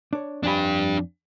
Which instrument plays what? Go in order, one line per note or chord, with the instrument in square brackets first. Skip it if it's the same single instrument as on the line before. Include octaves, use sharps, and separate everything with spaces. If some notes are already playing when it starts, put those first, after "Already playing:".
[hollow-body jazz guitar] D4 C#5
[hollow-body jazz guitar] F2 G#5 B5 [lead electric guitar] D4 G4